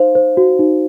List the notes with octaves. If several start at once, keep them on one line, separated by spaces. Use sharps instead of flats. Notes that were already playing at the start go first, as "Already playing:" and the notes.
Already playing: D#4 C5 F5
C5
F#4
D#4